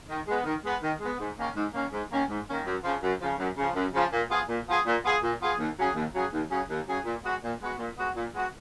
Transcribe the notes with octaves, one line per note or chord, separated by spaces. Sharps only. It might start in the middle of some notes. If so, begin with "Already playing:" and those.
D#3
G#3 B3
D#3
G#3 B3
D#3
G#3 B3
G#2
D#3 A#3 C#4
G#2
D#3 A#3 C#4
G#2
D#3 A#3 C#4
G#2
D#3 A#3 C#4
F#2
C#3 F3
F#2
C#3 F3
F#2
C#3 F3
F#2
C#3 F3
A#2
F3 B3 F4 G#4
A#2
F3 B3 F4 G#4
A#2
F3 B3 F4 G#4
A#2
F3 B3 F4 G#4
D#2
C#3 F#3 C#4 G#4
D#2
C#3 F#3 C#4 G#4
D#2
C#3 F#3 C#4 G#4
D#2
C#3 F#3 C#4 G#4
A#2
G#3 B3 F#4
A#2
G#3 B3 F#4
A#2
G#3 B3 F#4
A#2
G#3 B3 F#4